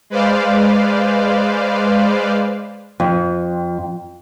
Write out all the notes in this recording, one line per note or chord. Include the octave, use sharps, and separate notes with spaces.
G#3 B4 C5 D5 F5
F2